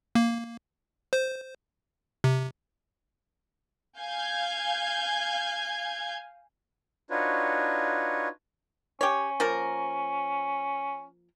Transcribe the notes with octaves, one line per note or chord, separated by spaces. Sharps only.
A#3
C5
C3
F5 G#5 G6 G#6
D4 D#4 F4 F#4 B4 C#5
C#4 G4 C#5
F3 A#3 A#4